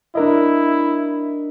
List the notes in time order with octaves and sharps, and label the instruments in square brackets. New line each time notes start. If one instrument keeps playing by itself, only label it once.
[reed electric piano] D4 A#4 D#5 [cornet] E4